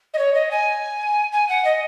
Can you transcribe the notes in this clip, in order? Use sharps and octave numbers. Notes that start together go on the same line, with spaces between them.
D#5
C#5
D#5
G#5
G#5
F#5
D#5